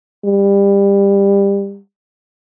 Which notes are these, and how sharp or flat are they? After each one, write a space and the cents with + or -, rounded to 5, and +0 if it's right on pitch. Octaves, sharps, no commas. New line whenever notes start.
G3 +25